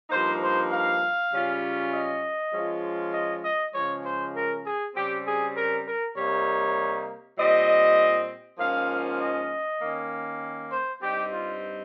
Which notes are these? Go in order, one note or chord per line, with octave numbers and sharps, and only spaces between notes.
G2 F3 A#3 D#4 C5
C5
F5
C#3 G3 C#4 F4
D#5
F3 G#3 C#4 F4
D#5
D#5
C#3 F3 G#3 C#5
C5
A#4
G#4
C#3 G3 C4 G4
G#4
A#4
A#4
C3 G3 A#3 D#4 C#5
A#2 G3 C4 D#5
G#2 F3 A#3 C#4 F4 F5
D#5
D#3 A#3 C#4
C5
G2 G3 C4 D#4 G4
F4